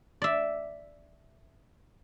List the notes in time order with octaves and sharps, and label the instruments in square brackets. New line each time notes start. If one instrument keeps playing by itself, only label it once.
[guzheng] D5 E5